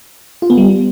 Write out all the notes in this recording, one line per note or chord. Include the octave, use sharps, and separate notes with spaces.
F4
B3
G3